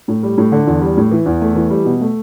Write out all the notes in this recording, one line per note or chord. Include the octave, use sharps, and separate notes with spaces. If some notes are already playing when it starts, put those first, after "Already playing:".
A2
G3
A2
D3
E2
G3
A2
E3
E2
A3
E3
G3
B2
A3